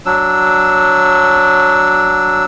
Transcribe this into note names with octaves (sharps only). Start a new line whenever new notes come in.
F#3 D4 E6